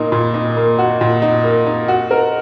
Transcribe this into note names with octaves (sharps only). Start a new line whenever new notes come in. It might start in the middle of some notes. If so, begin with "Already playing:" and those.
Already playing: A#2 A#3 D#4
A#2
D#4
A#3
F#4
A#2
D#4
A#3
D#4
F#4
A#4